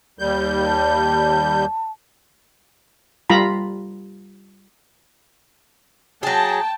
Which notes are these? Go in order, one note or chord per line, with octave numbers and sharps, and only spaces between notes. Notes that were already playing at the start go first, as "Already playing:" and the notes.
D#2 G3 G6
A5
G3 F4 A#5 B5
F#3 G#4 G5 A5